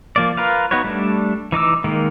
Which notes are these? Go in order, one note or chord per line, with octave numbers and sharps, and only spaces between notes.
F3 A#3 D5
F4 A#4 B4 F5
B3 D#4 F#4 B4 C#5
G3 A3 D4
E3 D#4 D6 E6
D#3 G#3 A#3